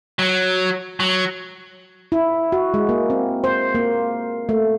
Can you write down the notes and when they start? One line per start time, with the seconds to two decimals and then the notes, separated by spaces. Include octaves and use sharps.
0.19 F#3
1.00 F#3
2.12 E4
2.52 F#4
2.74 G#3
2.89 A#3
3.10 C4
3.44 C5
3.75 A#3
4.49 A3